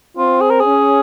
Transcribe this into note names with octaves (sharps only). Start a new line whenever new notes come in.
C4 F4
G#4
A#4
C#4 G#4